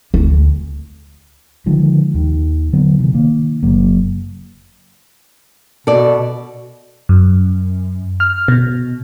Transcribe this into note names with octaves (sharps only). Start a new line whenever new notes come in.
D2
D3 D#3 F3 G#3
D#2 D#3
D3 F#3 B3
C3 D#3 E3
D#3 A#3
F#1 F#3 A#3
B2 A4 D5
F#2
F6
B2